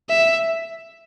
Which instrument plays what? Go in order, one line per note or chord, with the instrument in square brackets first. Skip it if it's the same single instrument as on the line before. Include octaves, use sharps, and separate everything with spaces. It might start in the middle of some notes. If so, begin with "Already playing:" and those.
[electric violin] E5